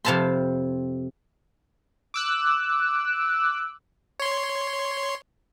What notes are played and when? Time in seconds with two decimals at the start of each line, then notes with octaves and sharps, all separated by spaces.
0.05 F2 C3 F5 A5 B5 C6
2.14 D6 E6 F#6
4.20 C#5 C6